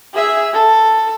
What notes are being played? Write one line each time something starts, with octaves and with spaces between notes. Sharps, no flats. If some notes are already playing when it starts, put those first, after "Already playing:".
G#4 E5
A4